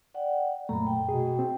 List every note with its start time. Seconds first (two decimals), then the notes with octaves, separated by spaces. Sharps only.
0.14 D5 F#5 G5
0.69 F#2 A#2 A3 A#5 B5
0.87 G5
1.09 B2 G#4
1.39 C4